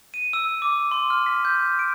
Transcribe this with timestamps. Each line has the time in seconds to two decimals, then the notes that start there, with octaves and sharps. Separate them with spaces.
0.14 D#7
0.33 E6
0.62 D6
0.91 C6
1.10 F6
1.26 B6
1.45 G6
1.79 D7